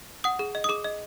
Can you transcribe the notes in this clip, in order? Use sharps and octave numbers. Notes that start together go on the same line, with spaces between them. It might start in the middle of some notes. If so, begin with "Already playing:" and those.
F#5 D#6
G#4
D#5
D#6
G#4 D6
D#5